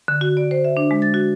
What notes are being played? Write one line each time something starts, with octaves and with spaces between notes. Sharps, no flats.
D3
F#4
D5
C5
E5
D4
G#3
A6
F#4